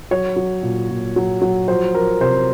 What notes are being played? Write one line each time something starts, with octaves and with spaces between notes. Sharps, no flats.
F#3 C#5
F#3
A#2
A#2
F#3
F#3
F3 C5
F3 A#4
C3 C5